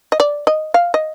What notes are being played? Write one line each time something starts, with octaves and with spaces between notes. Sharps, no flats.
D#5
D5
D#5
F5
D#5